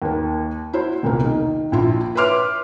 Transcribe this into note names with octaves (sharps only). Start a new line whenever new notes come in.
D#2 A#3
E4 F#4 C5
E1 C2 A#2 A#3
D#3
A#1 F3 E4 F4
B4 C#5 E5 C6 D6 F6